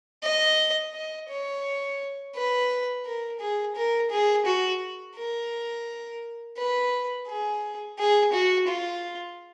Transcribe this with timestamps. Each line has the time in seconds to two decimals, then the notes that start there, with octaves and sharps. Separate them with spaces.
0.23 D#5
0.94 D#5
1.29 C#5
2.35 B4
3.06 A#4
3.40 G#4
3.76 A#4
4.11 G#4
4.46 F#4
5.16 A#4
6.57 B4
7.28 G#4
7.99 G#4
8.33 F#4
8.68 F4